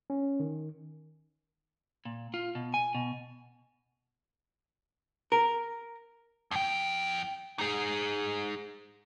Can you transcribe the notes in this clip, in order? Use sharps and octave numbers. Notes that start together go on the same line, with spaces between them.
C#4
D#3
A#2
F4
B2
G#5
B2
A#4
F2 G5
D#4 G#4